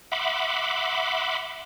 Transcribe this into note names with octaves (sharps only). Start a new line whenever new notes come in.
E5 F#5 B5 C6 D6